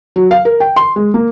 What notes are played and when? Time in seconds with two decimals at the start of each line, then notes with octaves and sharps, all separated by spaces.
0.16 F#3
0.31 F5
0.45 A#4
0.60 G5
0.76 C6
0.96 G#3
1.14 A#3